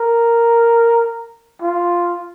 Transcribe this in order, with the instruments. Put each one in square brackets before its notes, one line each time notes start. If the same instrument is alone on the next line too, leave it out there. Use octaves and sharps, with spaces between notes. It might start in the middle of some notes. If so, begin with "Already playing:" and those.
Already playing: [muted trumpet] A#4
F4